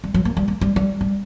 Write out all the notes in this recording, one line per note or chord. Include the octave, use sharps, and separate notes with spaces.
G3
F#3
A#3
G3
A#3
G3
G3
G3